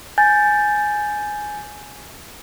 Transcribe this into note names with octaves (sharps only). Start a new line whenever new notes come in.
G#5 G6 A6